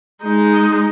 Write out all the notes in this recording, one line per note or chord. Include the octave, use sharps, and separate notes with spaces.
G#3 D#4